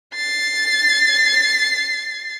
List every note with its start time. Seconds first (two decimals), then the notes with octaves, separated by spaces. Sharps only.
0.16 A6 C7